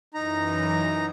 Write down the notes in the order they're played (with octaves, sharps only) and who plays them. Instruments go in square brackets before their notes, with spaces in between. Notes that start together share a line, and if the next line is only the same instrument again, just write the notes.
[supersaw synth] F#2 E3 [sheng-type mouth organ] D#4 A#5